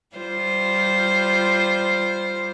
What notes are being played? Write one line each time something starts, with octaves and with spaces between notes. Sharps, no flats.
G3 F4 C5